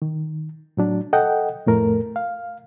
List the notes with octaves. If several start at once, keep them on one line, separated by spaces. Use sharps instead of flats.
D#3
A2 F#3 D4
A4 D#5 F#5 G5
F2 A2 A3 A#4
F5